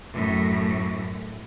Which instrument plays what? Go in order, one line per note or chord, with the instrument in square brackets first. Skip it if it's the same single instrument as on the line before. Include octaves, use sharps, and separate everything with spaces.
[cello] F#2 A2